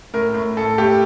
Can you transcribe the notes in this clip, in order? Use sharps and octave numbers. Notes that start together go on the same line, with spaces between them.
A2 A#4
A2
A2 A4
A2 G4